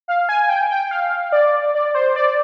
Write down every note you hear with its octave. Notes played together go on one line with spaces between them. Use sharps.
F5
G#5
G5
G5
F5
D5
D5
C5
D5